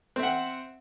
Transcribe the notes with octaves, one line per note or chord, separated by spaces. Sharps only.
C4 E5 F#5